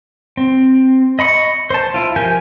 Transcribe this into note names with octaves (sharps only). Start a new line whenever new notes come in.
C4
D#5 B5 C#6
C5 A5
E4 F4
F3 G4 A#4 G#5 G6